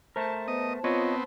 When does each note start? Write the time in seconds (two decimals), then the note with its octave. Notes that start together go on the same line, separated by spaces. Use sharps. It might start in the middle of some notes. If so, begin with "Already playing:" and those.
0.16 A3 A#4 C5 A5
0.48 B3 D#5
0.84 B3 C4 F4 C#5 D#5